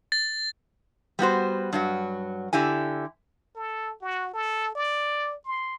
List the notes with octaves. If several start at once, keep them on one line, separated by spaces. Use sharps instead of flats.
A6
G3 B3 F#4 C5
G2 F#3 F#4
D3 E4 G4 G#5
A4
F#4
A4
D5
C6